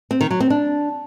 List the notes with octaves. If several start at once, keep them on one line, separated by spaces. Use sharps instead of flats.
C4
D#3
F#3
C4
D4